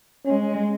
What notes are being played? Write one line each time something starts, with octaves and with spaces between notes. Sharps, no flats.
G#3 C#4